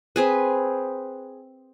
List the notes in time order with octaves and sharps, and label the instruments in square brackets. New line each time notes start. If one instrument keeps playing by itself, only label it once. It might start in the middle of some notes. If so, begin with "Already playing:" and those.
[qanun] C4 G#4 B4